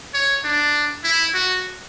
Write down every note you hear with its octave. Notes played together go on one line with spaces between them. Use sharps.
C#5
D4
E4
F#4